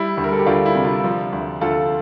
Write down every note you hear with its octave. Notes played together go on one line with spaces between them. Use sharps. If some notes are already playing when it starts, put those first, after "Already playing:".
Already playing: G3 E4
D2
A#4
A4
G4
D2 D4 F4
E4
C3
D4 F4
F3
D2
D2 F4 A4